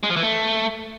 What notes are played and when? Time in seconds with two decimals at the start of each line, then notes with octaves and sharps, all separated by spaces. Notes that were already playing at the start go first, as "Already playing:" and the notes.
0.03 G#3
0.10 F3
0.16 E3
0.23 A3